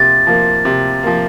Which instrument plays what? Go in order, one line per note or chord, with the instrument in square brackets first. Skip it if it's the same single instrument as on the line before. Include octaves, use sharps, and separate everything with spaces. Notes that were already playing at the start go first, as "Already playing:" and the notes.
Already playing: [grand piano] C3 F3 A#3 [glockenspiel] A6
[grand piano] F3 A#3
C3
F3 A#3